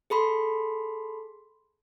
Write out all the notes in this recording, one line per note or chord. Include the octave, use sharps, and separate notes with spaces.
G#4 A4 B5 C6